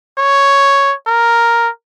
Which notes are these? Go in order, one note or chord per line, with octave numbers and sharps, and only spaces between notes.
C#5
A#4